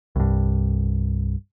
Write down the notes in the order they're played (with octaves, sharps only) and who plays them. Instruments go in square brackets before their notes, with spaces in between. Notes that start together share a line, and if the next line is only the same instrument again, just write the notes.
[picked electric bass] C2 G2